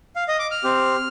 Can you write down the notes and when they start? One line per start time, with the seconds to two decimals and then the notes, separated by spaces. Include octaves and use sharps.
0.16 F5
0.28 D#5
0.39 D6
0.51 F6
0.64 C4 G4